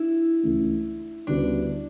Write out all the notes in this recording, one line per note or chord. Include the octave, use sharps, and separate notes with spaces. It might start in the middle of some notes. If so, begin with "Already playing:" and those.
Already playing: D4 E4
C#2 C#3 E3 A3
D2 C#3 G3 B3 D4 F#4